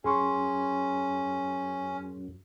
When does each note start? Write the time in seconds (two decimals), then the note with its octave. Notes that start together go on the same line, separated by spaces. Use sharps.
0.04 F#2 C#4 G#4 C6 C#6